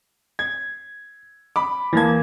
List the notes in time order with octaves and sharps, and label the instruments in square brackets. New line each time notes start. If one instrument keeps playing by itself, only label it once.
[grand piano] G#6
B5 D6
[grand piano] E2 A#3 G#6 [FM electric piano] E3 A5